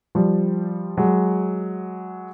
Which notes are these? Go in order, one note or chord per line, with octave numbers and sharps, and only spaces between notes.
F3 G3
F#3 G#3